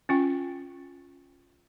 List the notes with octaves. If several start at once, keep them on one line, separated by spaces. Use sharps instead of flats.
C#4 F4 G5